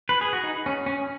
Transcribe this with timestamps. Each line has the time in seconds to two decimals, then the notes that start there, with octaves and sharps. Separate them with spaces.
0.09 B4
0.21 G#4
0.33 F#4
0.44 D#4
0.66 C#4
0.86 C#4